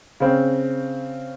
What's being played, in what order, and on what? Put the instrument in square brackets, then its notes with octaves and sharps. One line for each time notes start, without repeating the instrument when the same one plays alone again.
[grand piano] C#3 C4